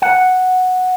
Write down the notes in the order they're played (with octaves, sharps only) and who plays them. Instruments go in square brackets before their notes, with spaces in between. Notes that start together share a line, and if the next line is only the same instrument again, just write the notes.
[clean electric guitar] F#5